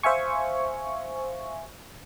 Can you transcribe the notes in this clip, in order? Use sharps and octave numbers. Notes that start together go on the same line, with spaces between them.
C5 E5 F5 G#5 C#6